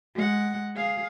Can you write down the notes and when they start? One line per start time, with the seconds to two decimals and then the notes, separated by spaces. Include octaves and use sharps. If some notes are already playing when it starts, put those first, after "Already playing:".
0.14 G#3 F#5
0.75 G#4 F5